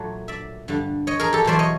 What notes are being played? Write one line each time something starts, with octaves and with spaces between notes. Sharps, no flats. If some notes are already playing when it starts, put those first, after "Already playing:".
Already playing: A#2 F#3 A3
D5 E5
G2 D3 G3
C#5 D#5
G#4 A#4
G4 A4
E2 B2 F#3 A3 C5 D5
C#5 D#5